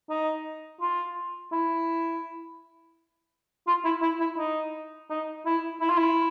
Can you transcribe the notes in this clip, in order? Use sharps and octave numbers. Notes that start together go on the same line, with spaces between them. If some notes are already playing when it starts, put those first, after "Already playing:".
D#4
F4
E4
F4
E4
E4
E4
D#4
D#4
E4
E4
F4
E4